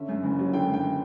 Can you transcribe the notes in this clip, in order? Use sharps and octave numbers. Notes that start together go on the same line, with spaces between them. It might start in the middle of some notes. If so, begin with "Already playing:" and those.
Already playing: D3 C#4 E5
F#2
F#1
F#3
D3 G5
F#2
G5